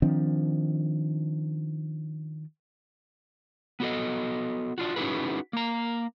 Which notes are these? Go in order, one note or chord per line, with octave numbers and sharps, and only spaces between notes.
D#3 F3 C4 D4
B3 F#4 A4 D#5
D4 F4 F#4
C#4 D#4 E4 F#4 G#4 B4
A#3 A#5